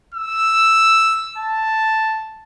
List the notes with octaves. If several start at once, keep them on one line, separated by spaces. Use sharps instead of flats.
E6
A5